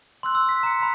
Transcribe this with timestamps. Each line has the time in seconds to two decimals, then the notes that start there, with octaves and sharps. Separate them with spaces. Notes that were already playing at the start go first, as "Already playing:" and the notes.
0.23 C6 E6 F#6
0.35 E6
0.49 B6
0.63 A#5 C#7
0.80 B5 B6